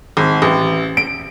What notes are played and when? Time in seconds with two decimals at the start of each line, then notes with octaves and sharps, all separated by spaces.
0.17 G#1
0.42 A1
0.97 D7